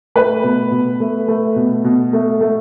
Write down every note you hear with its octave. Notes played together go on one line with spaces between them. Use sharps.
A3 B4
B2
B2
A3
A3
B2
B2
A3
A3